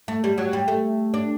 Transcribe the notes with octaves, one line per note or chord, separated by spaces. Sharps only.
A3
G3
F#3
G3
A3
D4